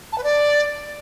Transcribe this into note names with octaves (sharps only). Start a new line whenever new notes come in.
A5
B4
D5